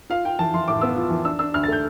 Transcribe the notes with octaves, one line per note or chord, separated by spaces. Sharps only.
F4 F5
F4 G5
E3 A5
E3 C6
A2 D6
B3 E6
F4
E3
D4 E6
D4 E6
D2 F6
A6
A3 G6